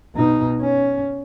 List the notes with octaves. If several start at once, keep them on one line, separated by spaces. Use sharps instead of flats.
B2 D#4
C#4